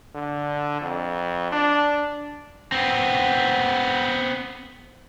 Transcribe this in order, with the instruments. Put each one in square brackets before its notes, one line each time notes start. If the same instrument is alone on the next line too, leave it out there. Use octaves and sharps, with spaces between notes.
[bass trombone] D3
F2
D4
[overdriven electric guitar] B3 C4